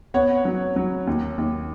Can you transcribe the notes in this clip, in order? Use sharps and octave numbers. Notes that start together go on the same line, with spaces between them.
B3 C#5 F#5
F#3
F#3
D#2
D#2